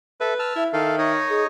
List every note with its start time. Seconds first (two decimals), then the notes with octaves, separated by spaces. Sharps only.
0.21 A4 B4 E5
0.39 A5 E6 F6
0.56 E4 E5
0.73 D#3 A4 F5
0.98 D#4 C#5 D#5
1.30 G#4